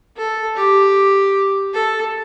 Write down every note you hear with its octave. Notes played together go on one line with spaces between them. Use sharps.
A4
G4
A4